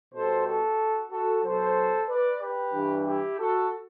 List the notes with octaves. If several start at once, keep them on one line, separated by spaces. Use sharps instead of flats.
B2 G3 A4 C5
F#4 A4
F#4 A4
B2 F#3 A4 C5
B4 D5
G4 B4
G2 E3 G3
E4 G4
F#4 A4